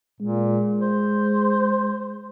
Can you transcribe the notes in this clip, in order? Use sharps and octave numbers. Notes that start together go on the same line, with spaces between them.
A#2 G#3
C5